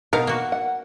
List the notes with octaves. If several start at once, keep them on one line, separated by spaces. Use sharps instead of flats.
B2 D#4 A#4 F5
A#3 F#4
F#5